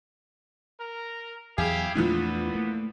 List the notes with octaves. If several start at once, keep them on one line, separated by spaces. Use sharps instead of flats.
A#4
E2 F#3 E4 G4 G#4 F5
E2 A#2 E3 F3 A3 B3 D4
A3 A#3